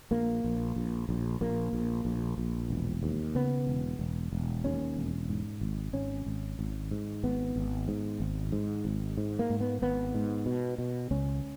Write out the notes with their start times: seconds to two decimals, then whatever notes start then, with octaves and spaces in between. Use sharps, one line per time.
0.11 A#1 A#3
0.44 A#1
0.76 A#1
1.09 A#1
1.41 A#1 A#3
1.73 A#1
2.05 A#1
2.38 A#1
2.70 E1
3.03 D#2
3.35 C#3 B3
3.67 E1
3.99 E1
4.33 E1
4.64 D#2 C#4
4.96 E1
5.29 G#2
5.61 G#1
5.93 G#1 C#4
6.26 G#1
6.59 G#1
6.91 G#2
7.23 G#1 B3
7.56 G#1
7.88 G#2
8.20 G#1
8.52 G#2
8.85 G#1
9.17 G#2
9.39 A#3
9.50 G#2
9.60 B3
9.82 G#1 B3
10.14 G#2
10.46 B2
10.78 B2
11.11 C#2 C#4